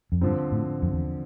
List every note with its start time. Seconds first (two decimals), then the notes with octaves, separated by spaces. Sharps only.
0.12 F2
0.21 G2 D3 F3 C4
0.52 A2
0.82 F2
0.93 E2